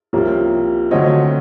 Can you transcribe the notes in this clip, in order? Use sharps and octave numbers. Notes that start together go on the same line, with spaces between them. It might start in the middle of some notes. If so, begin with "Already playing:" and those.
C2 C3 F3 A#3 C#4
D2 D3 F#3 A3 C4 C#5 D#5